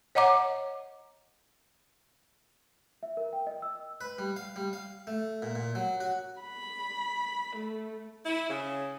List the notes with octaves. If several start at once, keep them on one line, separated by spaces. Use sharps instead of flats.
C#5 D#5 F#5 A#5 D6
E5
A#4
G5
D#5
E6
B4
G3
F5
G3
F5
A3
A#2
A#2
F#3
F#4
B5
A3
E4
C#3